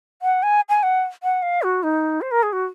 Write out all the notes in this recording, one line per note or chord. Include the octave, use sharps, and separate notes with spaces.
F#5
G#5
G#5
F#5
F#5
F5
F#4
D#4
C5
A#4
G#4
F#4